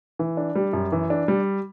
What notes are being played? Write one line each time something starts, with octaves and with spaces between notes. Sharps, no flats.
E3
D4
G3
F#2
E3
D4
G3